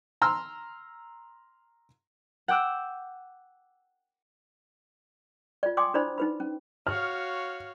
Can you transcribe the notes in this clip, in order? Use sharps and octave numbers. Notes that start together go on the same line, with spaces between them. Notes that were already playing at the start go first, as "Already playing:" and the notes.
A#5 C6 E6 F6
F#5 G5 D6 E6 F#6
F4 D5
D5 G5 G#5 C6 D6 D#6
D4 E4 C5 D5 B5
D#4 B4 B5
C#4
F#4 C#5 F5 F6